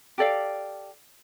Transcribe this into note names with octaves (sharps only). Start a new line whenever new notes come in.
G4 A4 D5 F5